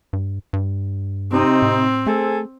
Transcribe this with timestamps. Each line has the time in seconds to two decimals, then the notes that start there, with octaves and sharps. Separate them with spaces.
0.13 G2
0.53 G2
1.32 C3 C4 D#4
1.62 A2
2.07 A3 G#4 A4 C5